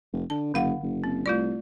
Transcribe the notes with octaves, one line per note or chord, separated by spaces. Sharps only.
F1
D3 A5
F#1 D3 F5 F#5
F#1
C4
C2 A3 F4 D5